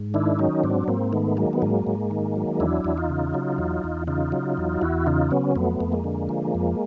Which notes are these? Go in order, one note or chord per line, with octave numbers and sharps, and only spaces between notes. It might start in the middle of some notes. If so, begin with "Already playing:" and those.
Already playing: G#2
D#3 D4 E4
F#3 C#4 D#4
G#2 C4 D4
G#2 A#3 C4
D#3 A3 B3
F#3 G#3 A#3
B3
G#2 G#3 A#3
G#2
D#3
F#3
E2 D4 E4
E2
D#4 F4
C#3
F#3
E2
E2
C#3 D#4 F4
F#3
E2
E2 E4 F#4
C#3 D#4 F4
F#3 B3 C#4
F2 A3 B3
F2
G#3 A#3
D3
F3
F2